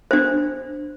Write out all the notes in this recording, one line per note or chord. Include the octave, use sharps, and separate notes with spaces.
D4 C5